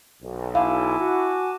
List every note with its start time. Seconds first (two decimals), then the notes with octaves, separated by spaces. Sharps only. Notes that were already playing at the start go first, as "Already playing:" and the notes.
0.21 B1
0.55 E4 F5 G#5 A5 D6
0.98 F#4